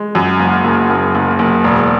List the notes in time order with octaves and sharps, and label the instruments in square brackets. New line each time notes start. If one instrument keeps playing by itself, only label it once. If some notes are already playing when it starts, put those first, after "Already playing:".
Already playing: [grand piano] G#3
F#2
F#1
F#1
F#1
F#1
F#1
E1